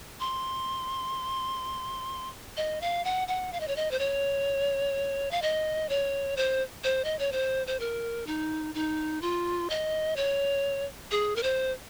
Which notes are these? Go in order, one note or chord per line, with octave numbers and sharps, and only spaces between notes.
C6
D#5
F5
F#5
F#5
F5
D#5
C#5
D#5
C5
C#5
F5
D#5
C#5
C5
C5
D#5
C#5
C5
C5
A#4
D#4
D#4
F4
D#5
C#5
G#4
A#4
C5